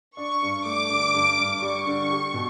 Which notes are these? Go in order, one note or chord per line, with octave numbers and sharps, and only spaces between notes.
D4 C#6
G2
A3 D6
D3
G2
G2
G3 C#6
D3
G4
B2